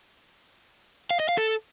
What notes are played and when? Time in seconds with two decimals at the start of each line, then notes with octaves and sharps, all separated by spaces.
1.11 F5
1.20 D#5
1.29 F5
1.38 A4